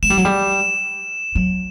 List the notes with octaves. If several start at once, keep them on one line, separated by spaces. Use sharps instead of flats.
G#3 E7
G3
F#3
G3
F#3